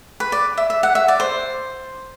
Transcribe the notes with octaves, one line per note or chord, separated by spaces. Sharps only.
B4
D5
E5
E5
F#5
E5
D5
C5